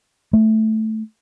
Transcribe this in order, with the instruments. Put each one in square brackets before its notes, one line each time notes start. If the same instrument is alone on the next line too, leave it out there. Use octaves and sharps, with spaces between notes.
[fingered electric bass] A3